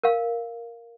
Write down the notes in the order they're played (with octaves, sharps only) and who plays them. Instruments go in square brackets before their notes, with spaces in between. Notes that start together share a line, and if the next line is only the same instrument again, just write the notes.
[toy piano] A#4 F5